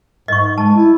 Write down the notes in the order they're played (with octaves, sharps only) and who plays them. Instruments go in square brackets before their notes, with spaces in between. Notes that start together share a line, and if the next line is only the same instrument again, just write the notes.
[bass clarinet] G#2 [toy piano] D#5 C#6
[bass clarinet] G#3 [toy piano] A5
[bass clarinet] E4